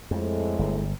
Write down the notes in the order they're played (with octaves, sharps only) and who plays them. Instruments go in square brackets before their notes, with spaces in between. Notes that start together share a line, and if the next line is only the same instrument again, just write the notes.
[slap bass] F2 [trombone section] A2 G#3
[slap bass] G1